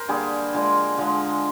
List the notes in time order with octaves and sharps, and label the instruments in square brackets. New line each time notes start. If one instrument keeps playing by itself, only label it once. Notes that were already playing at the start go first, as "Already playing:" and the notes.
Already playing: [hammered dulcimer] A#4 C5
D3 G3 A#3 G#4
D3 F3 G#3
D3 F3 G#3